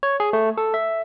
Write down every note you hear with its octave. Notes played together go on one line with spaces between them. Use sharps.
C#5
G#4
A3
A4
E5